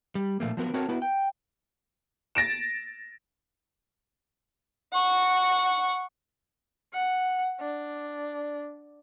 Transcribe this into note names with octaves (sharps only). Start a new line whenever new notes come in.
G3
A#2 F3 A3 A#3
F3 F#3 B3 A#4
C4 F#4 A4 A#4 C#5
B3 E4 F#4 B4
G5
A6 A#6 D7 E7
F#5 C#6
F#5
D4